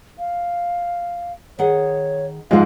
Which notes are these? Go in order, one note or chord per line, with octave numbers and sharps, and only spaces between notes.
F5
D#3 G#4 C#5 F#5
G#2 C3 F3 G#3 G4 F5